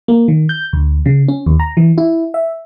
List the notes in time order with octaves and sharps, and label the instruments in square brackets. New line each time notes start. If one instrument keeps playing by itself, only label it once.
[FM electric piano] A#3
D#3
G6
D2
C#3
C#4
D#2
A#5
E3
E4
E5